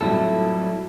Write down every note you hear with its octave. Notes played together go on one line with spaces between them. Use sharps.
F2 A2 F#3 G3 E4 A4